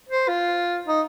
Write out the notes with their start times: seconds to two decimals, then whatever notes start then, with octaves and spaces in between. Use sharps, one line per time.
0.09 C5
0.28 F4
0.88 D#4